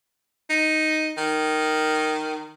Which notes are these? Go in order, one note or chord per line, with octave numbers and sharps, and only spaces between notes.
D#4
D#3